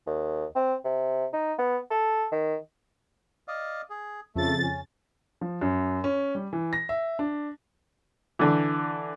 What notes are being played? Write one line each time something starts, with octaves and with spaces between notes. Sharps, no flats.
D#2
C4
C3
D#4
B3
A4
D#3
D5 D#5 F5
G#4
F2 C#3 A3 A6
C#4
F3
F#2
C#4
G3
E3
A#6
E5
D4
D3 E3